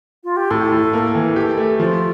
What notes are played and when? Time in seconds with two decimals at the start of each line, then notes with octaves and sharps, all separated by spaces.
0.24 F4
0.37 G4
0.51 A2 A4
0.72 A2
0.93 A#3
1.15 E3
1.36 G4 A4
1.57 A3
1.80 F3 F4